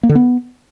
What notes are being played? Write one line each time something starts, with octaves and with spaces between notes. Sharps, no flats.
A#3
D3
B3